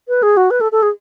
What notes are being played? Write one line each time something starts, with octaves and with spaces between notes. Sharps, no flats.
B4
G#4
F#4
B4
A4
A4
G#4